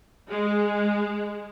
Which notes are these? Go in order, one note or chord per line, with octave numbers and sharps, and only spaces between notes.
G#3